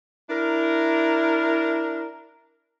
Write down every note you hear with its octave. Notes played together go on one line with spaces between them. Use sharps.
D4 E4 A#4